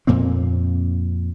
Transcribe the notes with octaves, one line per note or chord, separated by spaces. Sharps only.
F2 A#2 A#3 C4